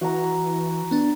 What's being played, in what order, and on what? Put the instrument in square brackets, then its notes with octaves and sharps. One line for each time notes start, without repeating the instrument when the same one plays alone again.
[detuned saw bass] E3 [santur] F#4 A#5
[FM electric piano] B3 D4